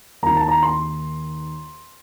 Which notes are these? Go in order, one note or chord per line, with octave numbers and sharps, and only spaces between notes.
D#2 D#3 A#5
A5
A#5
C6